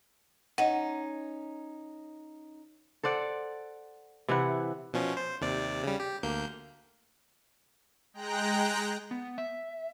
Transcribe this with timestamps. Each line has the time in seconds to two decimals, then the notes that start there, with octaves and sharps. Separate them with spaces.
0.58 C#4 D#4 F#5
3.03 A4 C5 D5 F#5
4.28 C3 E3 E4 F#5
4.93 B2 F3 C#4
5.17 C5
5.41 D#2 C3 D5
5.83 C#3 G3
6.00 G4
6.23 D2 A#3 G6
8.14 G#3 G5 A#5 F#6
9.11 B3
9.38 E5